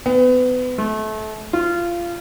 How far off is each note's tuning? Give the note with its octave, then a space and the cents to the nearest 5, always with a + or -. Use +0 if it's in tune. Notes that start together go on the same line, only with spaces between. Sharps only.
B3 +35
A3 -30
F4 -20